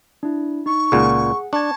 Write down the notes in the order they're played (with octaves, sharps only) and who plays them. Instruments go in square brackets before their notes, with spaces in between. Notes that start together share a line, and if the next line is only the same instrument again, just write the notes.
[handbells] D4 E4
[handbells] D#4 [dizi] C#6
[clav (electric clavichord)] C#2 A#2 [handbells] G#4 F#5
[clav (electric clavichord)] D4 [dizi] A5 [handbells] C#6 G#6